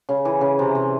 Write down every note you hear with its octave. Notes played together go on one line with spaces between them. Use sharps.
C#3
E3
C#3
C3
C3